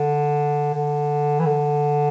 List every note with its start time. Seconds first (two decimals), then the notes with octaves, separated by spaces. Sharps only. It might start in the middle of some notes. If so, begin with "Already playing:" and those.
Already playing: D3
0.74 D3
1.40 E3
1.46 D3